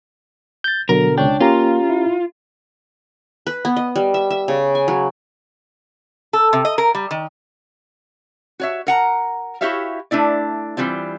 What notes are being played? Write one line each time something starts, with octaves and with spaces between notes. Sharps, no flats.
G6 A6
B2 D3 F#3 A#4
C#2 D4 C#5 G5
A#3 C#4 F4 G4 A#5
E4
B4
B3
D#5
G3
E5
E5
C#3
G#5
F#3
A4
C3
D#5
A#4
G3
D#3
F#4 C#5 E5
A#4 F#5 A#5
E4 F#4 G4 C#5 E5 F5
A3 D4 E4 D5
E3 G3 C4 F4